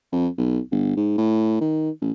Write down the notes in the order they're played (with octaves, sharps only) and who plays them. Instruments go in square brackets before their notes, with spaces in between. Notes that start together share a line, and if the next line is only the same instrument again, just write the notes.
[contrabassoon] F2
B1
G1
G#2
A2
D#3
A1